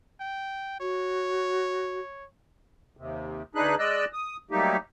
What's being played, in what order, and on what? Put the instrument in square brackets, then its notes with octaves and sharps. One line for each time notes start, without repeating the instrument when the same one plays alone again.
[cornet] G5
[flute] F#4 [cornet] C#5
[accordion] D#2 C3
D2 D4 D#4 G#4 B4 F#6
G#3 D5 D#5 E6 F#6
D#6
F#3 G3 A3 A#3 D#4 G4